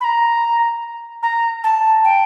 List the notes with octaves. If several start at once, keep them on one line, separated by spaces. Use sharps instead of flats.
B5
A#5
A#5
A5
G5